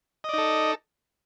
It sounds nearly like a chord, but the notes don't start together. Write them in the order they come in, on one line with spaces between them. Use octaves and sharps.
D#5 D5 D#4 A4